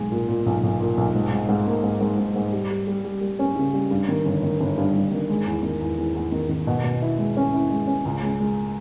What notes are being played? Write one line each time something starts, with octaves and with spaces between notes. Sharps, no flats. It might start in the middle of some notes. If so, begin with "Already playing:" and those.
Already playing: B1 G#3
A#2
A#2
B1
B1
A#2
B1
G#2
G#2
G#2
A#3
G#2
G#2
G#2
G#2
G3
G3
G3
G3
G3
C#4
C#3
G3
G2
D#3
G1
D#3
G1
G2
G2
D#3
G#3
E2
D#3
E2
E2
E2
D#3
D#3
B2
B2
E4
G#3
C#4
E4
G#3
C#4
C#2
G#3
G#3